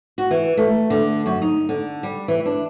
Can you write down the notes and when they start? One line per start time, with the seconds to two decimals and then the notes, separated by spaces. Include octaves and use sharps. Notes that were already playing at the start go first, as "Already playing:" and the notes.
0.18 F#4
0.31 E3
0.57 A3
0.90 D3
1.26 F#2
1.42 D#4
1.69 D3
2.03 G3
2.28 E3
2.45 D4